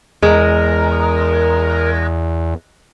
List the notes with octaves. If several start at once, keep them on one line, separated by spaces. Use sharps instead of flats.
E2 G#3 A#4